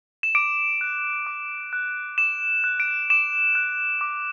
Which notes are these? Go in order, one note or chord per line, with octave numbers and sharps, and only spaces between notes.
E7
D6 D7
F#6
D6
F#6
D6 E7
F#6
D7
D6 E7
F#6
D6